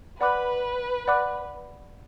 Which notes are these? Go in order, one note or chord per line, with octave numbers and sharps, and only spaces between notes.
B4 D5 F#5 B5 D6 F#6
D5 F#5 B5 D6 F#6